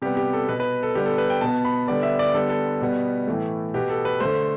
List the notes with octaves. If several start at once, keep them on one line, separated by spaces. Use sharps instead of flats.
C3 G3 B3 G4
G4
A4
B2 B3 B4
B4
A4
D3 G3 B3 G4
A4
B4
G5
B2 B3 A5
B5
D3 G3 B3 D5
E5
D5
D3 G3 B3 A4
A4
B2 G3 B3
A2 E3 A3
B2 B3 G4
A4
B4
D3 A3 C5